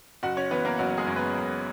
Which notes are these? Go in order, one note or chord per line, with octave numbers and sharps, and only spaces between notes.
F#1 F#4 F#5
C#4 C#5
E3 B3 B4
A#3 A#4
F#1 F#3 F#4
G#3 G#4
F#2
B3 B4
F#1